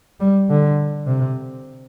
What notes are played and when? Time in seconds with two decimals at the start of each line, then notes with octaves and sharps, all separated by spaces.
0.20 G3
0.50 D3
1.06 C3